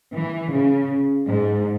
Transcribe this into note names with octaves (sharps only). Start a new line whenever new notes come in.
E3
C#3
G#2